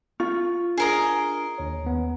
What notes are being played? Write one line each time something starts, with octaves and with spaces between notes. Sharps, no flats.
F4 C#6
D4 G#4 A#4 D#5
D#2 C#5
D#2 B3